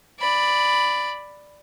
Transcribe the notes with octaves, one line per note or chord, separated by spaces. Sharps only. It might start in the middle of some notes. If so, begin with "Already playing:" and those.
D5 B5